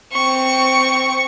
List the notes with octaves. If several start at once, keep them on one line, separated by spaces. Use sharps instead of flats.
C4 C#6